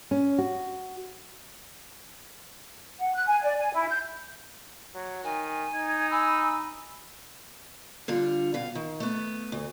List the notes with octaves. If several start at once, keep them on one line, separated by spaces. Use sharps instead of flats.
C#4
F#4
F#5
F#6
G#5
D5
G#5
E4
G6
F#3
D#3 G#5
D#4 G#6
G#5 B5 E6
D3 G3 F4
B2 F5
D#3
A3 B3
D2